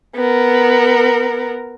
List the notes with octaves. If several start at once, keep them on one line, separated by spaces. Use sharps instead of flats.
B3 A#4